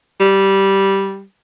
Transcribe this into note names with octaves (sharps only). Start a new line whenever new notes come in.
G3